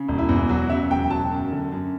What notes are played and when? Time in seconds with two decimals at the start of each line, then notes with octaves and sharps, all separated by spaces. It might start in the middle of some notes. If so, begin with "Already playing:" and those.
Already playing: C#3
0.08 E1
0.18 E4
0.29 E2
0.49 F#3 F#4
0.69 C#3 E5
0.90 E1 G5
1.10 F#3 A5
1.31 F#2
1.52 D3
1.72 F#2